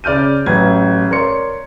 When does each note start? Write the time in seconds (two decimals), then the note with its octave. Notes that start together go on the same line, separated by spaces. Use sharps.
0.04 C#3 D5 F6 G6 D#7
0.46 A1 F#3 G#6
1.11 A#4 C#5 D5 C6 C#7